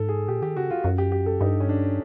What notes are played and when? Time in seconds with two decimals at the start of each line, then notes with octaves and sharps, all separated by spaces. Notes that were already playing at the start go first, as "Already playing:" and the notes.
Already playing: G#2 A4
0.09 G#4
0.28 A#2 G4
0.42 D#3 G4
0.56 C#3 F#4
0.71 F4
0.84 F#2 F#4
0.98 G4
1.12 G4
1.26 A4
1.41 G2 D#4
1.60 C#4
1.69 D4